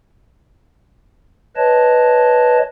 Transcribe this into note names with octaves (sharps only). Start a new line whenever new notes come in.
B4 C#5 D#5 A5